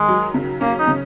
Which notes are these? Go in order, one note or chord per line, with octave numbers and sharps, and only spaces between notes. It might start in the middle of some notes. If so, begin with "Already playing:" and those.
Already playing: D#3 G#3
F#3
C#3
A#3 C#4
D#4
C#3